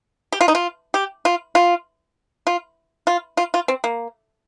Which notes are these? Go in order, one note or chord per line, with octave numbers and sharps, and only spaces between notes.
G4
F4
D#4
F4
G4
F4
F4
F4
F4
F4
F4
C4
A#3